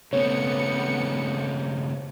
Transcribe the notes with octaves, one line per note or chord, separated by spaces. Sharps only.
C#3 A3 B3 C4 C#5 C#7